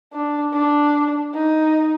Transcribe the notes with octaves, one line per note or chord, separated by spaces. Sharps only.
D4
D4
D#4